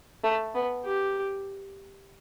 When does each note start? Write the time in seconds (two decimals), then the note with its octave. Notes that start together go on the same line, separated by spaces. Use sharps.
0.24 A3
0.55 B3
0.85 G4